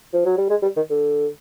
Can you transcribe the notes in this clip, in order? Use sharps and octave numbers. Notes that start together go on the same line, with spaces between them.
F3
F#3
G3
G#3
G3
D#3
D3